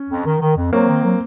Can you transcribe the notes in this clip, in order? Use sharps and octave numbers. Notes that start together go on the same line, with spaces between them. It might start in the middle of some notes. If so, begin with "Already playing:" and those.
Already playing: C#4
F2
D#3
D#3
F2
F#3 A#3 C4
D#3
F#3